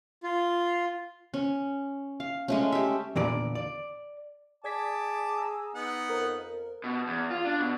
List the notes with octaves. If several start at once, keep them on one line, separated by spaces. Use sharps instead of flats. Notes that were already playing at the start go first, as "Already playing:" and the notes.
F4
C#4
F5
G#3 A3 C#4
G4 E5
E2 A#2 D3 D5
D5
G#4 D5 A5 D6 G#6 B6
A#5 E6
B3 D#4 F#5
F2 A#4
B2
E2
F4
D4
B2